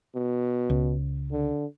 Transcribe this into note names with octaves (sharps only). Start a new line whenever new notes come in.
B2
C#2
D3